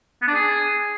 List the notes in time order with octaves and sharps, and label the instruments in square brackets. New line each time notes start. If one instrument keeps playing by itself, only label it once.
[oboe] B3
D4
G#4